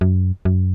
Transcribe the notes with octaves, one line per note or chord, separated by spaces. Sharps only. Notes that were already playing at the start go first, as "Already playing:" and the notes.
F#2
F#2